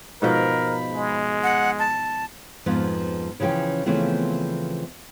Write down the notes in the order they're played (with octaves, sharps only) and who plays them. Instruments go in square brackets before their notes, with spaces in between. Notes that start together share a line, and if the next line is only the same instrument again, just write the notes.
[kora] G#2 B2 F3 [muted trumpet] A#4 [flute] B5
[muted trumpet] G#3
[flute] F#5
A5
[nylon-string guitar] F2 G#2 F3 B3 B4
C#3 E3 F3 C#4 G5
C#3 E3 F3 A3 B3 C4